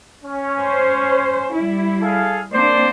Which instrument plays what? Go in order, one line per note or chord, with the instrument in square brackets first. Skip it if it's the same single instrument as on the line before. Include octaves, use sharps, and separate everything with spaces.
[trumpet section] C#4
[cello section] C5
G3 E4
[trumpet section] G#4 A4 F5
[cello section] A#3 C4 D4 [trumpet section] C5 D5